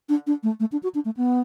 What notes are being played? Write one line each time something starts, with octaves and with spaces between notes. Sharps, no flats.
D4
D4
A3
A3
D4
F#4
D4
A3
B3